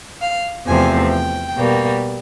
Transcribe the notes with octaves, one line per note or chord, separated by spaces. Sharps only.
F5
E2 C3 F3 A3 C4 G#5
G5
B2 G3 A#3